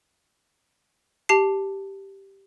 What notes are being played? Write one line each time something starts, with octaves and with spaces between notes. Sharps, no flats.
G4 A5 C7